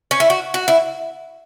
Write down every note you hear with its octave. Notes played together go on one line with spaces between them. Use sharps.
C#4
E4
F#4
F#4
E4